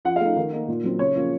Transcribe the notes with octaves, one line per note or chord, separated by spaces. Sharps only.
F3 F#5
F5
A3 D#4
D#3
A#3 D#4
A#2
F#3 C4
C#3 C#5
F3 A#3 C#4 F4